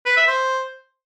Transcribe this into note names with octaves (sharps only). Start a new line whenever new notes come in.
B4
E5
C5